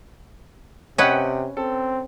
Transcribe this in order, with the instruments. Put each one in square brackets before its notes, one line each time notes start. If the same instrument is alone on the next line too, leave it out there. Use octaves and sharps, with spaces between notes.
[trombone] C3 [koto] C#4 B4 [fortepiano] D#5 F#5 G5
[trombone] C4 [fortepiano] A4